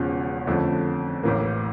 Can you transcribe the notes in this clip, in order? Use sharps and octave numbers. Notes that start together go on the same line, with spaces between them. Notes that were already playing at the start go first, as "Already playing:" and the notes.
Already playing: E1 E2 C#3 F3 C#4
F2 D3 F3 A3 C#4
A1 A2 E3 A#3